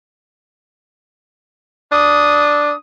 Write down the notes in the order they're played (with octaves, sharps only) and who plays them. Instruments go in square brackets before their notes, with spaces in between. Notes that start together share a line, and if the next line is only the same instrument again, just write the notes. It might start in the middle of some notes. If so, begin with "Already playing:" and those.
[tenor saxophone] D4 [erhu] D#6